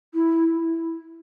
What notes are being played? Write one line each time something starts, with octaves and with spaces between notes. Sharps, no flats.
E4